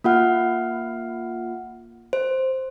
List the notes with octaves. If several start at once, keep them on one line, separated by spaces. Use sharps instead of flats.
A#3 F4 F#5 F6
C5